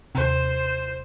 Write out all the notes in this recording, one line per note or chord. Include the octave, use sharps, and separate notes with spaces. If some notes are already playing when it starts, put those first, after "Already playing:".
D#2 C3 C5